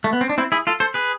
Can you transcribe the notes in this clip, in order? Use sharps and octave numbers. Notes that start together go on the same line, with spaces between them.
A3
B3
C4
D4
C4 E4
E4 G#4
F4 A4
A4 C5
G#4 B4